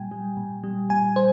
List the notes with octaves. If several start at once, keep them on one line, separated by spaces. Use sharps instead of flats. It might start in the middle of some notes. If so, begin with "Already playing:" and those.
Already playing: A#2 G3 G5 G#5
G3
A#2
G3
A#2 G#5
G3 C5